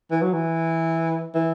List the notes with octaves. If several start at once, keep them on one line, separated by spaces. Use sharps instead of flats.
E3
F#3
E3
E3